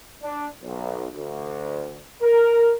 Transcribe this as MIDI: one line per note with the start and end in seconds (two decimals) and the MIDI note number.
0.23 0.47 62
0.63 1.06 35
1.12 2.00 38
2.22 2.73 70